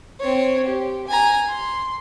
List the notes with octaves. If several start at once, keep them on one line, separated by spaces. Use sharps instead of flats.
C4 C#5
G4
G#5 A#5
C6